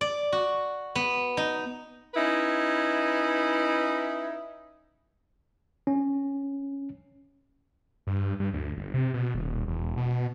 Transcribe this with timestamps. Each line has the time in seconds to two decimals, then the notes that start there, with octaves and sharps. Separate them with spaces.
0.01 D5
0.32 F#4
0.95 B3
1.37 D#4
2.15 C#4 D#4 E4 B4
5.87 C#4
8.07 G2
8.40 G2
8.53 D2
8.77 G1
8.94 C3
9.14 B2
9.34 D#1
9.68 E1
9.97 B2